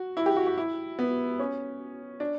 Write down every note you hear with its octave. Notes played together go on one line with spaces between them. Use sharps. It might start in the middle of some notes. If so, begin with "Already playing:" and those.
Already playing: F#4
E4
G4
F#4
F#4
E4
B3
C#4
D4